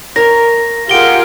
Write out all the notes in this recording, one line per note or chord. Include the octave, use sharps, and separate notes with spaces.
A#4 C#5 A#6
F4 G4 G#4 A#4 F#5 D7 G7